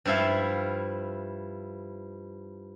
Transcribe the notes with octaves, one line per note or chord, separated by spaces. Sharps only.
G2 F3 E4 E5 F5